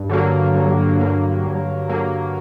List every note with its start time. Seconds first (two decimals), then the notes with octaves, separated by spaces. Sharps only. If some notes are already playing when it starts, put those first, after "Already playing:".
Already playing: G2
0.09 D3 F#3 A#3
0.54 G2
0.99 D3 F#3 A#3
1.44 G2
1.88 D3 F#3 A#3